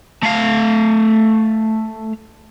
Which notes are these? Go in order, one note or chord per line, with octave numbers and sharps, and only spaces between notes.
A3 F5